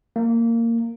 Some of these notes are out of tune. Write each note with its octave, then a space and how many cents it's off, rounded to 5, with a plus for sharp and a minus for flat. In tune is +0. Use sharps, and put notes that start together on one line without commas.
A#3 -15